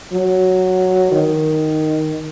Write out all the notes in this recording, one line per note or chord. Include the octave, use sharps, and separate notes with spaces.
F#3
D#3